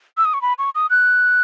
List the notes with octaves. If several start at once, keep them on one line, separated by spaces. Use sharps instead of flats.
E6
D#6
C#6
B5
C#6
D#6
F#6